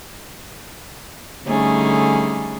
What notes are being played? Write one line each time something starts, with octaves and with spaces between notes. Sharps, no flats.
D3 G3 A3 C#4 D#4 G#4